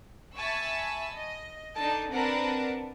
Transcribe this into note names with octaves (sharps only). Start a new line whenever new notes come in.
E5 G#5 A5 B5 C#6 E6
D#5
D4 D#4 A4 A5
C4 D4 A#4 B4 F#5 A5